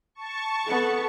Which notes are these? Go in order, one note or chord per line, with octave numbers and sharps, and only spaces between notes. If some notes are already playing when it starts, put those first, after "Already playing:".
A5 C#6
B3 A4